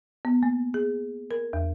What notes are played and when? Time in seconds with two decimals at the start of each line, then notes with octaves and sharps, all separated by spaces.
0.25 B3
0.43 A#3
0.74 G#4
1.31 A#4
1.53 E2